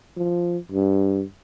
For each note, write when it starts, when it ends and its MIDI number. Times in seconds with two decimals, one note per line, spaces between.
0.17 0.57 53
0.72 1.24 43